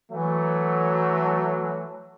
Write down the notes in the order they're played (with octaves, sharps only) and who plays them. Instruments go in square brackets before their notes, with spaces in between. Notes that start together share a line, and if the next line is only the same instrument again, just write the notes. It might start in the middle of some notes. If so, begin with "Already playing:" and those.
[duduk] E3 [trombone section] F#3 A3